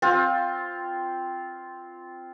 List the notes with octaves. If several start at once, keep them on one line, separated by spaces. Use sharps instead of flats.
C4 F4